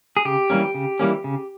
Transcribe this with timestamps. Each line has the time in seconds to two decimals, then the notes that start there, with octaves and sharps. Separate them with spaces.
0.17 G#4
0.25 C#3 G4
0.50 E3 G3 A#3 C#4
0.74 C#3
1.00 E3 G3 A#3 C#4
1.24 C#3